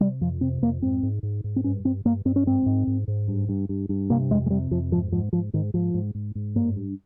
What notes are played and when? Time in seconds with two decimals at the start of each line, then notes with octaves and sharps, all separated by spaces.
0.01 C3 G3
0.21 F2 F3
0.41 C3 C4
0.62 F2 A#3
0.82 G#2 C4
1.03 G#2
1.23 G#2
1.44 G#2
1.56 C4
1.64 G2 C#4
1.85 G2 C4
2.05 G2 A#3
2.25 G2 C4
2.36 C#4
2.46 G#2 C4
2.66 G#2
2.87 G#2
3.08 G#2
3.28 G2
3.49 G2
3.69 G2
3.89 G2
4.10 C3 A#3
4.31 F2 G#3
4.46 G#3
4.50 C3 G3
4.71 F2 F3
4.92 G#2 F3
5.12 G#2 F3
5.33 G#2 F3
5.53 G#2 D#3
5.74 G#2 F3
5.94 G#2
6.15 G#2
6.35 G#2
6.55 G2 A#3
6.76 G2